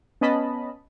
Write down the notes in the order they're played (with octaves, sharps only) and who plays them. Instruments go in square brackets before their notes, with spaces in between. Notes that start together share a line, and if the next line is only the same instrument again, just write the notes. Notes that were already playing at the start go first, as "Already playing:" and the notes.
[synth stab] B3 C#4 D#5 A5 B5